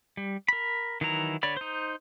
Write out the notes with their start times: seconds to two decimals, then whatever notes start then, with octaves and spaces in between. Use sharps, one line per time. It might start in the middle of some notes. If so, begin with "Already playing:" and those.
0.17 G3
0.48 A#4 B5
1.01 D#3 E3 F#3 E4 A#5
1.43 D3 C#5 D5 B5
1.57 D#4 C5